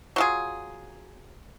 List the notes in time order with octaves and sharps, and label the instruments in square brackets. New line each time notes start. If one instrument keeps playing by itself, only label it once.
[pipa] F#3 F4 G#4